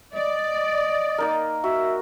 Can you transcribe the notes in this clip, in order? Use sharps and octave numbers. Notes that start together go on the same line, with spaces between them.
D5 D#5
A#3 D#4 A#4
F#4 E5